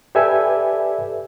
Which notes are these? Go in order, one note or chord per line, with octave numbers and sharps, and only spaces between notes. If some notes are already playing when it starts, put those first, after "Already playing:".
G4 A4 B4 D5 E5 G#5